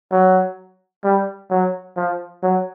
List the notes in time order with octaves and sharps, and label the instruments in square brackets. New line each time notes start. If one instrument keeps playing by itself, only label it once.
[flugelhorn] F#3
G3
F#3
F3
F#3